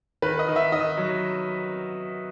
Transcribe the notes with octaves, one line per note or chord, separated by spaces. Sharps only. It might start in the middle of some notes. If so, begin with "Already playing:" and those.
D#3 B4
D#5
D#3
E5
D#3 D#5
F#3